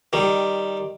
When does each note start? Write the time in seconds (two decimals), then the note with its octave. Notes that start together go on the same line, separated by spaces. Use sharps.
0.13 D#3 G3